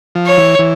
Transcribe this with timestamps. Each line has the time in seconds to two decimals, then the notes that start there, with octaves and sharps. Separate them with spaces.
0.15 F3
0.26 C#5
0.37 E3
0.59 E3